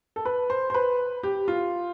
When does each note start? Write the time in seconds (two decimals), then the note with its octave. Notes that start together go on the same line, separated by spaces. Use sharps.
0.16 A4
0.25 B4
0.50 C5
0.70 C5
0.74 B4
1.23 G4
1.48 F4